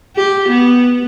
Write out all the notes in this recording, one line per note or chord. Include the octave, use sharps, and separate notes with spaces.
G4
B3